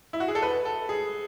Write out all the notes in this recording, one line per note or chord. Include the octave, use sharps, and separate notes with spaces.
E4
F#4
G#4
A4
B4
A4
G#4